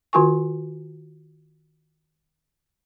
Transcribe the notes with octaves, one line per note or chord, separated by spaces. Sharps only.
D#3 F4 F#4 A#4 G#5 C#6